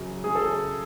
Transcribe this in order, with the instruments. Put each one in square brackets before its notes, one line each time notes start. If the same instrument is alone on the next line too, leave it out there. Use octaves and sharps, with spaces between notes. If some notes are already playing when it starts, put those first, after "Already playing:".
Already playing: [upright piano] F#2 C#3 F#3
[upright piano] F#2 C#3 F#3 C#4 [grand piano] G#4
[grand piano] A4